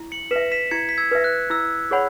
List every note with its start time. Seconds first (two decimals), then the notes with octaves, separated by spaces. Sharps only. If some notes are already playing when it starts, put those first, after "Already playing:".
Already playing: E4
0.12 C#7 F#7
0.31 B4 E5 B6 E7
0.52 B6 E7
0.71 E4 G#6 C#7
0.89 B6
0.98 E6 G#6
1.11 B4 E5
1.24 F#6
1.50 E4 E6
1.91 G#4 C#5 F#5 B5